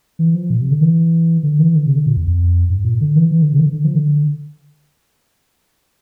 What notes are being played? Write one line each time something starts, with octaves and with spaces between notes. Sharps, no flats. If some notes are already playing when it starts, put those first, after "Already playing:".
E3
F3
A#2
C3
D3
E3
D3
E3
D3
C3
D3
A#2
E2
F2
G2
A#2
D3
E3
E3
D3
C3
E3
D3
D3
F3
D3